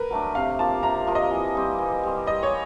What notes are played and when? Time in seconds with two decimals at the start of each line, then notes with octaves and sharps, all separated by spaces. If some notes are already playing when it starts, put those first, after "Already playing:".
Already playing: A#4 B4
0.10 F#3 A3 D4
0.35 C3 F5
0.59 F3 A#3 A5
0.82 C3 A#5
1.07 F3 A#3
1.15 D#5
1.31 E3
1.55 G3 C4
1.78 E3
2.03 G3 C4
2.26 G3 D#5
2.43 C#5